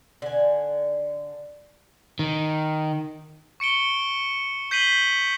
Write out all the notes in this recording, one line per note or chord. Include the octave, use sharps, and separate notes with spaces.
D3 G#5
D#3
C#6 C#7 D7 G7
G6 B6 C7 D#7 F#7 G7